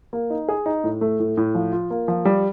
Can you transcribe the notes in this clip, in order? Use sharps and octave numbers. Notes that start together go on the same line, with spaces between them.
A#3
D#4
G#4
D#4
A2
A3
A2
A2
F3
F4
A#3
F3
G3